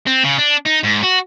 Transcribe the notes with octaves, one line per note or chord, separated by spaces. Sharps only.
C4
C#3
D4
D#4
G#2
F#4